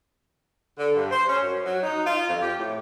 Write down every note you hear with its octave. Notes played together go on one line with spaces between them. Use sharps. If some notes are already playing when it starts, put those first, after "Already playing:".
D3
G2
C5
C#4
F#2
F#3
D#4
F4
F2
G4
A2